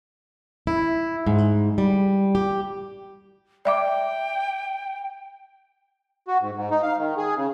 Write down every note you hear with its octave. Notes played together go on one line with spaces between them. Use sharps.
E4
G#2
G3
G4
D5 E5 G5 D6
F#4
G#2
G#2
D#4
F5
D#3
G#4
C#3